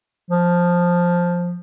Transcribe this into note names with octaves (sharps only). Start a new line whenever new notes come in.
F3